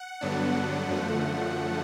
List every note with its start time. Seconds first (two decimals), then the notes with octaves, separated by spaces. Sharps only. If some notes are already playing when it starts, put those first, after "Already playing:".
Already playing: F#5
0.21 G2 D3 F#3 B3 D4
0.89 F#2 D3 F3 A3